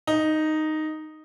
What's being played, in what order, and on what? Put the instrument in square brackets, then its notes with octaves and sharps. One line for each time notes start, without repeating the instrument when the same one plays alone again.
[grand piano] D#4